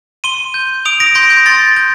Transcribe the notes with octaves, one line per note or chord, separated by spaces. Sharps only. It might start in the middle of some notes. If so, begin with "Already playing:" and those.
C6 D#7 G7
G6
D#6 D7 F7
A#6 D7
C6 G6 A#6
G6
C6 A6
G6